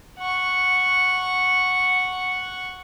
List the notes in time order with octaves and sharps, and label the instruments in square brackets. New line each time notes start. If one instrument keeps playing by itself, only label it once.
[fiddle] F#5 C#6